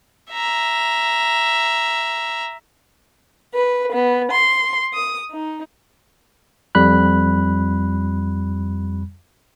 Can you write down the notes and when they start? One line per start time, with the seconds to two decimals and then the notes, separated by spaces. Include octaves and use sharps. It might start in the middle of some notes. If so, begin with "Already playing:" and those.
0.31 E5 A#5
3.53 B4
3.91 B3
4.30 C6
4.93 D#6
5.30 D#4
6.75 F2 G3 B5 F#6